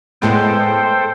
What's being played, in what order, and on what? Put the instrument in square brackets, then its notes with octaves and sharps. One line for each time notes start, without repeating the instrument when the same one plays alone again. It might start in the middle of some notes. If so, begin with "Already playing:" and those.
[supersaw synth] A2 G#3 B3 [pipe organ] A4 C5 G5